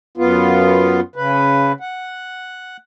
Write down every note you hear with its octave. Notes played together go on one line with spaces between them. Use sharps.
F#2 B3 F4
C#3 B4
F#5